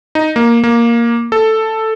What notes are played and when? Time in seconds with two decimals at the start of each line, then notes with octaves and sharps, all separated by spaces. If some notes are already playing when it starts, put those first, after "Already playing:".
0.15 D#4
0.36 A#3
0.64 A#3
1.32 A4